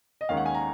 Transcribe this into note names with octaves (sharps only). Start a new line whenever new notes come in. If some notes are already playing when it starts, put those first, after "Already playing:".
D#5
D#2 D#3 G#3 C#4 F5
F#5
G#5
A#5